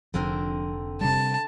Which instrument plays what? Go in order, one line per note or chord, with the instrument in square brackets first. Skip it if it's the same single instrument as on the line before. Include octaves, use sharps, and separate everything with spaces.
[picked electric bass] F1 [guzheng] D3 C4 A#4 [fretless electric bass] F3 D4
[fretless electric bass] C3 G3 [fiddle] A5